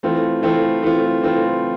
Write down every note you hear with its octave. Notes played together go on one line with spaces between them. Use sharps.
E3 A3 C4 F4
E3 A3 C4 F4
E3 A3 C4 F4
E3 A3 C4 F4